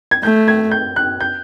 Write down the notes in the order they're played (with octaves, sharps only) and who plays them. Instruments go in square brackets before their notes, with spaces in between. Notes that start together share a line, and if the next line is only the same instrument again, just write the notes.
[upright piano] G#6
[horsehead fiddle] A3 [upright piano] G6
[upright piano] G#6
G6
F#6
G6